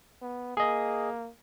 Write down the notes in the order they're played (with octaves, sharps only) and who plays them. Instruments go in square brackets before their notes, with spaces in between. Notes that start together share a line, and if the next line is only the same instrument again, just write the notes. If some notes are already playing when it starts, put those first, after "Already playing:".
[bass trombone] B3
[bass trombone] A#3 [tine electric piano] G#4 D#5